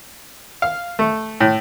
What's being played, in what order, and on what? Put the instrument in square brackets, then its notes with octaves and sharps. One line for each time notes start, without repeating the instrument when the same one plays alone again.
[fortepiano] F5
A3
A2